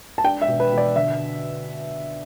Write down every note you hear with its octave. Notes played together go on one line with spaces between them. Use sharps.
A5
D4 G5
E5
B2
B4
B2
D5
D3 E5